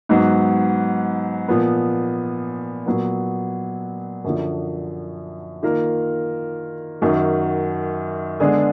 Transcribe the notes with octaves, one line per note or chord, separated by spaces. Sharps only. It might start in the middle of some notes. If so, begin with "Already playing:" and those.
G#2 F#3 B3
A#2 F3 B3
A#2 F#3 B3
F#2 D3 F3
D#3 A#3 F4 A#4
F#2 D#3 F#3
D3 G#3 B3 D4 G#4